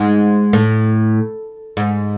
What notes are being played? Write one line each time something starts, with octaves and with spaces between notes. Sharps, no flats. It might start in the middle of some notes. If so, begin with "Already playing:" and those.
Already playing: G#2 G#3
A2
G#2